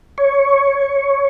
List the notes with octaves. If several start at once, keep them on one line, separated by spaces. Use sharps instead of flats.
C#5